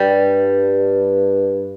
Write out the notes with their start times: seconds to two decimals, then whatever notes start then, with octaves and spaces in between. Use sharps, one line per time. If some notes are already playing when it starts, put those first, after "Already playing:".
Already playing: G2 G3